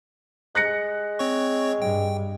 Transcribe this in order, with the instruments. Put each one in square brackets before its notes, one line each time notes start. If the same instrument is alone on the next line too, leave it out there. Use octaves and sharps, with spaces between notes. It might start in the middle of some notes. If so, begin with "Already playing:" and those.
[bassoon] G#3 [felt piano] F#6 A#6 C#7
[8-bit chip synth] C4 C#5 C#6
[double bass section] G2 [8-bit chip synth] G5